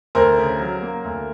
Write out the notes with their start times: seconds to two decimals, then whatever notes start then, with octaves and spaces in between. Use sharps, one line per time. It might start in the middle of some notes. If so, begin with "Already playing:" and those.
0.15 D2 A#4 C5
0.38 C#3
0.60 F#3
0.82 A#3
1.04 D2